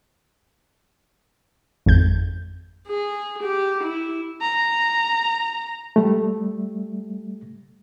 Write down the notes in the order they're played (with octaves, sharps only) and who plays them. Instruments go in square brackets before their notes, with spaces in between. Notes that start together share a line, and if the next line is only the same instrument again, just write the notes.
[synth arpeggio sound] G#1 F2 G6
[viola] G#4
G4
E4
[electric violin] A#5
[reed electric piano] G3 A3